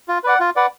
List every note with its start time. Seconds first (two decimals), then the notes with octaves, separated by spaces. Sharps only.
0.08 F4
0.24 B4 D5 F#5
0.40 F4
0.56 B4 D5 F#5